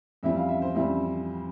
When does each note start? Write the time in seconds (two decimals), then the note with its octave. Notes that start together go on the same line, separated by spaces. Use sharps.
0.23 F2 E3 G3 C4 E5
0.36 F5
0.48 E5
0.62 C5
0.75 F2 E3 G3 C4 E5